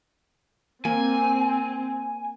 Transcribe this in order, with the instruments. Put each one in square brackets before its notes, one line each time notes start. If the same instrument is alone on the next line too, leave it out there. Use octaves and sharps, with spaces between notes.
[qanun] A#3 [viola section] C4 [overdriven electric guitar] G#5